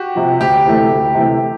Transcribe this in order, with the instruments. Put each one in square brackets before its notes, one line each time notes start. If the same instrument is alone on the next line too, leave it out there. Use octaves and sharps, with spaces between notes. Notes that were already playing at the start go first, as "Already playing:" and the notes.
Already playing: [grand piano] F#4 G4
[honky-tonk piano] C3 F3
[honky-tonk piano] D2 [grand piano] G4
[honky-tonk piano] C3 E3 A3
D2
C3 E3 A3